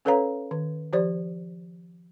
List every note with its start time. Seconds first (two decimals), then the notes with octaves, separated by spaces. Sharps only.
0.05 C#4 A4 B4 C#5 F5 A#5
0.51 D#3
0.93 F3 G4 C5 D5